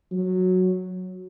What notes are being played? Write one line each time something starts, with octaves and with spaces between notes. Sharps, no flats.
F#3